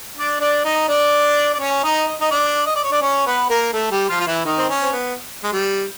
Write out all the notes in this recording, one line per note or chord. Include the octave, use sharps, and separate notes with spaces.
D4 D5
D4 D5
D#4 D#5
D4 D5
D5
C#4 C#5
D#4 D#5
D#5
D#4 D#5
D4 D5
D#5
D5
C#5
D4 D5
C#4 C#5
B3 B4
A#3 A#4
A3 A4
G3 G4
F3 F4
F4
E3 E4
D#3 D#4
C4
C#4
C4
B3
G#3
G3